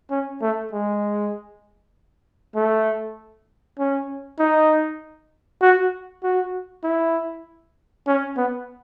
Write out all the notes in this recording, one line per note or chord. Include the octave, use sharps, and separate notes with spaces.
C#4
A3
G#3
A3
C#4
D#4
F#4
F#4
E4
C#4
B3